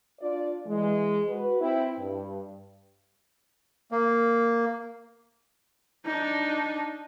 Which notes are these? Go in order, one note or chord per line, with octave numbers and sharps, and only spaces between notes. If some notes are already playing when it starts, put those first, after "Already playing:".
D4 F4 D5
E3 G#3
F#4 B4
C4 E4
G2
A#3
D4 D#4